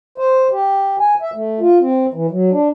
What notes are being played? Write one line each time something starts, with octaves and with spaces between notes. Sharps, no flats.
C5
G4
G#5
E5
A3
F4
C4
E3
F#3
D4